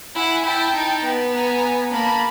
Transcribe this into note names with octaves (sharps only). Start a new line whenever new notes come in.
E4 F#5 G#5
E4 G5 A5
D#4
B3
G#5 A#5
A#3 A5 B5